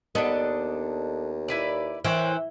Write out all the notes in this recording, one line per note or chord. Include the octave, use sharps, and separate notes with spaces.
D#2 B3 D4 A4 D#5
E4 B4 D5
E3 A#4 C5 C#5 G5